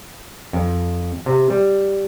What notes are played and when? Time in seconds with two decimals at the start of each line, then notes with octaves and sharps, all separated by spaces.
0.53 F2
1.26 C3
1.50 G3